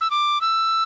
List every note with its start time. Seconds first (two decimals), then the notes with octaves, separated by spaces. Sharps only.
0.01 E6
0.11 D6
0.41 E6